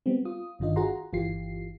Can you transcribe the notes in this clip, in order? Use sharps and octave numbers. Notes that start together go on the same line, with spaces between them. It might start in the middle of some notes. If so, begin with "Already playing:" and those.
G3 B3 C4
F4 D#6
G1 G2 D#3 D4 F4 D#5
F4 F#4 G#4 F#5 A#5 C6
G1 E3 F4 G4 C7